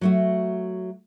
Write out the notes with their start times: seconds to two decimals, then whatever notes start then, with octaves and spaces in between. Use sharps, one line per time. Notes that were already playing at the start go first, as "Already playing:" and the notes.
0.01 F#3 A3 F#4